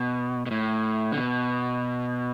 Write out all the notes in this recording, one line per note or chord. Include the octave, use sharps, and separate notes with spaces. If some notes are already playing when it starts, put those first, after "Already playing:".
Already playing: B2
B2
A2
D3
B2